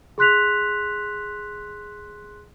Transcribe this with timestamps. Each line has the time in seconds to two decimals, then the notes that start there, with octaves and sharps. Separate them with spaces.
0.18 G#4 C6 F#6 B6 F7